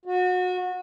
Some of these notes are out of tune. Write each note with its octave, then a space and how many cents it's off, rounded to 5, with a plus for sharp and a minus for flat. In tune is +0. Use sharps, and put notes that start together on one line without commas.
F#4 -25